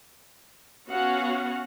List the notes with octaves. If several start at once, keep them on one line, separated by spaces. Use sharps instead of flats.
B3 C#4 F#4 F5 F#5